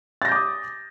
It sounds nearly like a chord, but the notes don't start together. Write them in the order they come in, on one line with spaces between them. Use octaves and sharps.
A6 A#6 G6 D6 D#6